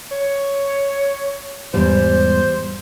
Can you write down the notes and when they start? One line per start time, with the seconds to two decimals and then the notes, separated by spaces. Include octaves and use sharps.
0.11 C#5
1.74 E2 G#2 G3 C5